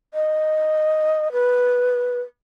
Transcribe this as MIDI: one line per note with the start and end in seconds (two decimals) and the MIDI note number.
0.14 1.32 75
1.32 2.21 71